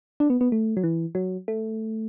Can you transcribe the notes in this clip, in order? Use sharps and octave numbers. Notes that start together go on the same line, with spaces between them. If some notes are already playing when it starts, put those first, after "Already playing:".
D4
B3
B3
A3
F#3
E3
F#3
A3